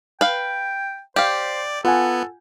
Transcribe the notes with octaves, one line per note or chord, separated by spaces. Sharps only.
B4 F5 G5
G4 C5 D5 F5 G6
B3 F4 A4 F#5 G#5